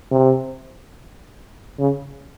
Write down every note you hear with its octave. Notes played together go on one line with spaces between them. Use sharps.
C3
C#3